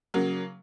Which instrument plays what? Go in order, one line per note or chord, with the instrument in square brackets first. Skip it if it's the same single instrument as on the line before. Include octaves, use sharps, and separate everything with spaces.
[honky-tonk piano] C#3 F#3 A#3